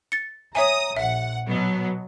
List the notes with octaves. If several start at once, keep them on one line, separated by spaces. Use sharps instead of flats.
A6 C#7
C#5 E5 G#5 A#5 D#6
A#1 E5 F#5
B2 F#3 B3